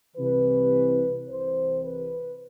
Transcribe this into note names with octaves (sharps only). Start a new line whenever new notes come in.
C2 C3 E3 B4
C2 C3 E3 C5
B4